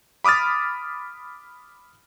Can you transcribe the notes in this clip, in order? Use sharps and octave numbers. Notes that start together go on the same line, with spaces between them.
B5 D6 D#6 F6 A6